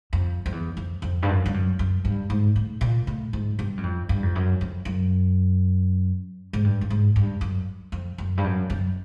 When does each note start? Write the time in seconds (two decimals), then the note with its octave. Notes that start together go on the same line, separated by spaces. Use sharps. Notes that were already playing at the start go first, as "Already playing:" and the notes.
0.13 F2
0.46 F2
0.52 E2
0.77 F2
1.02 F2
1.23 G2
1.29 F#2
1.46 G2
1.54 F#2
1.79 F#2
2.05 G2
2.30 G#2
2.56 A2
2.81 A#2
3.07 A2
3.33 G#2
3.59 G2
3.77 F#2
3.83 F2
4.09 G2
4.23 F2
4.35 F#2
4.61 F2
4.85 F#2
6.53 G#2
6.64 G2
6.81 G2
6.90 G#2
7.16 G2
7.41 F#2
7.92 F2
8.18 F#2
8.37 G2
8.44 F#2
8.70 F#2